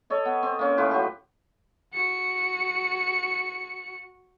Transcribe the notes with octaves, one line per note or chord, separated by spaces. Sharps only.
A4 C#5 D#5
B3
C4
A#3 C#4
A2 F3 B4 C5
F#3 G4
F#4 C#7